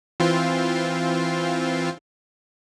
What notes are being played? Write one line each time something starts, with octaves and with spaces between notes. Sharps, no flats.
E3 C4 F4